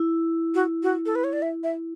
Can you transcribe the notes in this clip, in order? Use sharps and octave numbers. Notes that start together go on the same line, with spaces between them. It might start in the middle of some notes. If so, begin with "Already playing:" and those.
Already playing: E4
F#4
F#4
A4
B4
C#5
D5
E5
E5